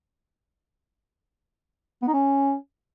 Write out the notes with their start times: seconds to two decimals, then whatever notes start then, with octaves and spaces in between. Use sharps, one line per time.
2.02 B3
2.08 D#4
2.13 C#4